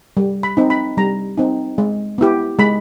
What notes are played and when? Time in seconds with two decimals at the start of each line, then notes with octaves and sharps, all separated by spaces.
0.17 G3
0.43 B5
0.57 C4 D#4
0.70 B5
0.97 G3 A#5
1.38 C4 D#4
1.78 G#3
2.18 B3 E4 G4
2.59 G#3 B5